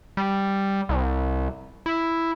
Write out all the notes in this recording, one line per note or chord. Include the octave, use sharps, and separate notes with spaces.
G3
C2
E4